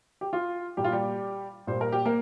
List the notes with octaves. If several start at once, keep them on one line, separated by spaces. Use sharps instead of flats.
G4
F4
A#2 G3 A#3 G4
F4
G3 G4
A#2 G3 A#3 C5
A#4
G4
A#3 A#4